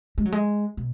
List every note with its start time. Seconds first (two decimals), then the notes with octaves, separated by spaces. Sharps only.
0.18 G#3
0.26 F#3
0.32 G#3
0.77 B2